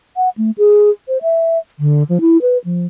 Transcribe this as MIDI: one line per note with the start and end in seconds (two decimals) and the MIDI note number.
0.17 0.29 78
0.38 0.51 57
0.58 0.90 68
1.08 1.22 72
1.22 1.58 76
1.79 2.03 50
2.09 2.18 53
2.21 2.38 64
2.42 2.58 71
2.65 2.86 53